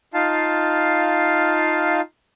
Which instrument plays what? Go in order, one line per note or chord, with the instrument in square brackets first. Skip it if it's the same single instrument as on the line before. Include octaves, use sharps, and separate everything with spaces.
[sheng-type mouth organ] D#4 F4 F5 A5